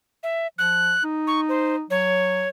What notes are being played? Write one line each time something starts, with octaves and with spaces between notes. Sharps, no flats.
E5
F3 F#6
D#4
C#6
C5
F#3 C#5